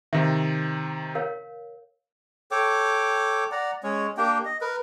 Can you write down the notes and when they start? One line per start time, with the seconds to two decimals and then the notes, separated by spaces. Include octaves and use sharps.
0.13 C3 D#3 E5
1.15 A#4 C#5 F5
2.51 A4 C#5 G5 D6
3.52 D5 F#5 A#5
3.83 G#3 C#4 C#5
4.17 A#3 D4 G4 G5
4.45 D#5
4.61 A#4 B4